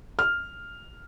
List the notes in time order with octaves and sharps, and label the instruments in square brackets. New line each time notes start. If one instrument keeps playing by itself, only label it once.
[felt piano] F6